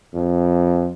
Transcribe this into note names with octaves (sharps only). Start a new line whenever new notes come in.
F2